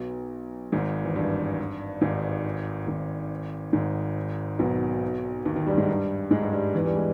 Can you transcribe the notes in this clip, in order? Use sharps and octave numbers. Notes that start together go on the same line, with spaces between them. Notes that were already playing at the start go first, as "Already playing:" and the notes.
Already playing: B1 B2
G#1 G#2
E2
G2
G#1 G#2
G#1 G#2
G#1 G#2
B1 B2
D#2 D#3
D#2 D#3
G2 G3
G#2 G#3
G2 G3
G#2 G#3
G2 G3
G2 G3
E2 E3
G2 G3
G#3